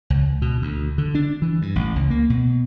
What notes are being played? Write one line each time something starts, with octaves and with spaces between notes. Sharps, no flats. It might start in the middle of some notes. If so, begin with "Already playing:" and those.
C#2
B2
D2
D3
D4
E3
G2
A1
C#2
A#3
B2